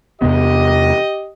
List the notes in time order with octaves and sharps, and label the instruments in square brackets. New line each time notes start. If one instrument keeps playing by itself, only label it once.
[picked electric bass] E2 C3 B3 [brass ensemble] G4 D#5